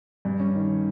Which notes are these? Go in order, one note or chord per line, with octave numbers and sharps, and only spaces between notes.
G2
C#4
D#3